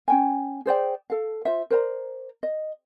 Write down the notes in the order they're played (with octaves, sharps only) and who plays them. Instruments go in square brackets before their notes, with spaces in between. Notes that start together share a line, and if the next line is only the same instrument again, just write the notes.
[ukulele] C#4 G5 G#5
G#4 C5 D5 G5
A4 F5
F4 C5 E5
A#4 C5 D5 A#5
D#5